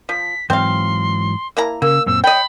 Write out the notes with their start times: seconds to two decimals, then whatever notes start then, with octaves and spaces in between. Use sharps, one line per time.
0.09 F3 B6
0.50 G#2 E3 F#3 C4 F5 C6
1.57 A#3 E4 A#5
1.82 C#3 A#3 E6
2.06 F#2 A#2 C4 E6
2.24 C#5 D#5 G5 B5